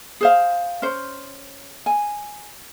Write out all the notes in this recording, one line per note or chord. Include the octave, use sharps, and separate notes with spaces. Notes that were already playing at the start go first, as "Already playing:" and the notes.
G#4 C5 F5
C#4 C5
G#5